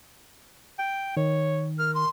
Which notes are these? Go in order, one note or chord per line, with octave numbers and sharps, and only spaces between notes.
G5
D#3 C#5
A#4 F6
C6